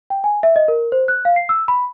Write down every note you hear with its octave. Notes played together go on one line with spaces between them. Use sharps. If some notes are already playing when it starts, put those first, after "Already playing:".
G5
G#5
E5
D#5
A#4
C5
F#6
F5
C7
E6
B5